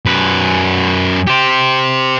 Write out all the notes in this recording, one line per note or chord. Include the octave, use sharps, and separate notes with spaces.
F#2 B4
G4 C5